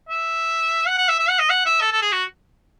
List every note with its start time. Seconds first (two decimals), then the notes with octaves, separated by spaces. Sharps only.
0.09 E5
0.87 F#5
0.98 F#5
1.09 E5
1.19 E5
1.29 F#5
1.39 D#5
1.50 F#5
1.66 E5
1.81 A4
1.92 A4
2.02 G#4
2.12 F#4